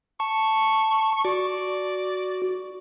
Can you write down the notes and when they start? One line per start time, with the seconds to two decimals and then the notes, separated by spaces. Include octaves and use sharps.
0.20 A5 C#6
1.25 F#4 D5